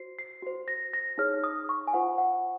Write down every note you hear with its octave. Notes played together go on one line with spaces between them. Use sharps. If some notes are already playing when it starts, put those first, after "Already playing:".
Already playing: F#4 C5 C7
C7
F#4 C5
A#6
A#6
D#4 G#4 C#5 F6
D#6
C#6
G#5
F4 C5 F#5
F#5